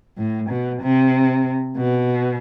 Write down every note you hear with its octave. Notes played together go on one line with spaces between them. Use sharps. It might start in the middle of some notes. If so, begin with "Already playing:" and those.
A2
B2
C3
B2